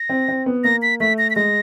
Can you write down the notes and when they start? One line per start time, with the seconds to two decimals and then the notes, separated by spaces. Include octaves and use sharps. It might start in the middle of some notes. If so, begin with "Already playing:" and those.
Already playing: A#6
0.09 C4
0.28 C4
0.46 B3
0.64 A#3 A#6
0.82 B6
1.00 A3 B6
1.18 A#6
1.30 B6
1.36 G#3 A#6